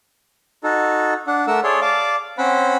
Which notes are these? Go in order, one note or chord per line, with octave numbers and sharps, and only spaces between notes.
D#4 F#4 A4
D4 F#5
A3 A#4 F#5 E6
G#4 A4 C#5 D5 C6
D5 F5 A5 D6
C4 C#4 C5 F#5 B5